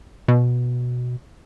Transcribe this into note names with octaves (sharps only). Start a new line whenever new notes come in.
B2